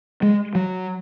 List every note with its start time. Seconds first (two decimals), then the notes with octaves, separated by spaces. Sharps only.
0.22 G#3
0.55 F#3